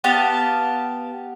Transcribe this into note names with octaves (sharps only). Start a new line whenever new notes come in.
B3 G4 F5 A5